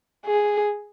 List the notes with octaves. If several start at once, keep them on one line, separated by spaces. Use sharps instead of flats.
G#4